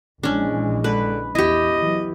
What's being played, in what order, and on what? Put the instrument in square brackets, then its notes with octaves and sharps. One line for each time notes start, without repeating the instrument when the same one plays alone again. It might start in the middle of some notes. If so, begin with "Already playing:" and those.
[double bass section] A#1 E3 G#3 [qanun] C#4 D4
[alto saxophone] D3 [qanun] B4
[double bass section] E2 [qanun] E4 G4 [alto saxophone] D#5
[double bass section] E3 F#3